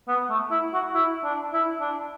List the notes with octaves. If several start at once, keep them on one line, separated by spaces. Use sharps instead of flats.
B3
A3
E4
F#4
E4
D4
E4
D4